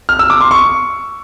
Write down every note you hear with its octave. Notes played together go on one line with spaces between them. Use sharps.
F6
E6
D6
C6
C#6